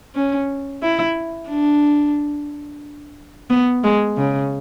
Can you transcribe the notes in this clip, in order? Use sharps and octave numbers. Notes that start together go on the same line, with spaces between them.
C#4
E4
D4
B3
G#3
C#3